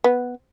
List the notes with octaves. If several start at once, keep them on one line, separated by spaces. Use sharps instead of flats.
B3